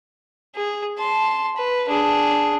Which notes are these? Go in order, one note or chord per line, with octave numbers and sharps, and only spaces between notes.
G#4
A5 C6
B4
D4 G#4